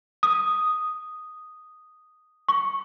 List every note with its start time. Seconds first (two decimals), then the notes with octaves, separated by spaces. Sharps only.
0.23 D#6
2.49 C#6